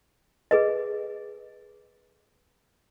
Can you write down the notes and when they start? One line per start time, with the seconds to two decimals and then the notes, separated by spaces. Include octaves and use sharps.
0.51 G#4 B4 D#5